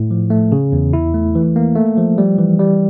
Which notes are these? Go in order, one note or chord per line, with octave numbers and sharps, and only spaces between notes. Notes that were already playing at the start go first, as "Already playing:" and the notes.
Already playing: A2
F3
A3
C#3
E2
E4
A3
E3
A#3
A3
F3
G3
E3
G3